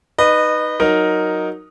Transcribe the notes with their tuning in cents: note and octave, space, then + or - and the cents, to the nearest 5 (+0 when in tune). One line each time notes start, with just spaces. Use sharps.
D#4 +0 B4 +0 D#5 -25
F#3 -5 D#4 +0 A#4 +0